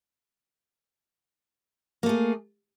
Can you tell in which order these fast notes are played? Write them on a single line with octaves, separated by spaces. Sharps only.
A#3 A3 G#4